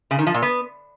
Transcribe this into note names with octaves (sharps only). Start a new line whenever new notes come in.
C#3
D#3
F3
A#2
B3